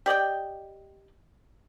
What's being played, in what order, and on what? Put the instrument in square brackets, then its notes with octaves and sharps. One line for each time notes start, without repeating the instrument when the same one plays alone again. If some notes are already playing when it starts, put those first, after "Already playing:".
[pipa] G4 D5 D#5 G5